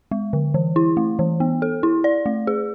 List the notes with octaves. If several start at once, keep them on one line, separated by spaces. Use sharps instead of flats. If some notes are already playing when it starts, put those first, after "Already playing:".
G#3
D3
E3
E4
A3
E3
B3
A4
E4
D5
A3
G#4